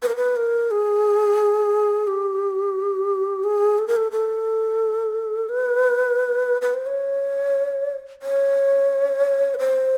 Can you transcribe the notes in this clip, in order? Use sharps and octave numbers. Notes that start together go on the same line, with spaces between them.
B4
A#4
B4
A#4
G#4
G4
G#4
A4
A#4
A4
A4
B4
B4
C5
C#5
C#5
B4
C5